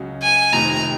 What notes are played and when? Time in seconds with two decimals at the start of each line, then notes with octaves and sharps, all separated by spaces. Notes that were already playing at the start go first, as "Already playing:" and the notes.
Already playing: C#2 C#3 F#3 C#4 F#4
0.23 G#5
0.53 F1 F2 C3 D#3 A#5